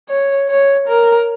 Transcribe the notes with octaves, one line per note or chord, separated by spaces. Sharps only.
C#5
C#5
A#4